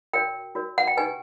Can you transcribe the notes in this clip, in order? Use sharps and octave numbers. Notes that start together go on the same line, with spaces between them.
F#4 A#4 C#5 G5
F#4 A#4 C#5
F#5
G5
D4 G4 B4 G#5